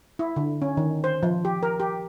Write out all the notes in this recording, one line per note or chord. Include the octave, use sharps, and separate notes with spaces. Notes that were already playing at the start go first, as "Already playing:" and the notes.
E4
D3
C#4
D#3
C5
F3
G4
A#4
G4